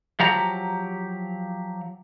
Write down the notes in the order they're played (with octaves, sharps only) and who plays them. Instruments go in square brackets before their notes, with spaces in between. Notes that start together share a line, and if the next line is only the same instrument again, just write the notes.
[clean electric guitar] F3 F#3 G4 A#5